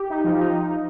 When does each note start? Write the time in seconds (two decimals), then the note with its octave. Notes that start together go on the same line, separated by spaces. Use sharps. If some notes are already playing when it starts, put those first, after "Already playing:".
Already playing: G4
0.10 D#4
0.24 F3
0.39 D#4